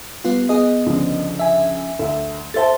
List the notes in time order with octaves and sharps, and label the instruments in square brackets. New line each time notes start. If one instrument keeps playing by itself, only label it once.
[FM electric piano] G3 B3 F4
B3 G#4 D#5
[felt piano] C#2 D3 F3
[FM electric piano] E5 G#5
[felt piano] D2 E5 [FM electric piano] A4
[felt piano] A4 E5 A5 [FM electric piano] C5 A6